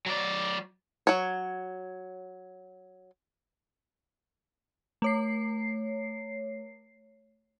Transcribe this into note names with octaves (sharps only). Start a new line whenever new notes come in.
F#3 D5
F#3 C#5
A3 C#5 C7